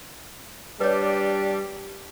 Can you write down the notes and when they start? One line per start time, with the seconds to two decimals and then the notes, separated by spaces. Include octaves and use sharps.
0.81 G3 D4 G4 B4 C#5